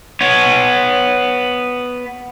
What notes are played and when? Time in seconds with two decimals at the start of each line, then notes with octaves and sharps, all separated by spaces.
0.21 B3 C#5